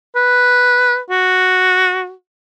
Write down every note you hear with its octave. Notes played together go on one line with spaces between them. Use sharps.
B4
F#4